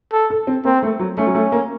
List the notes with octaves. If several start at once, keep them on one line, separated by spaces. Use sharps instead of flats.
A4
A4
C4
A#3 C4
A3
F#3
A3 C#4
F#3
A3
A#3